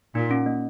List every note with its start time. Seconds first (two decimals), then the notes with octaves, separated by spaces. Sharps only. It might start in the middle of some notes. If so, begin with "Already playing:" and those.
0.15 A#2 D#4
0.31 C#4
0.46 A#3